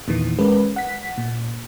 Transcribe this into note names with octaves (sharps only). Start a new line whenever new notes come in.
E2 A#2 D#3 E3
G#3 C#4 A#4 B4
F#5 B6
A#2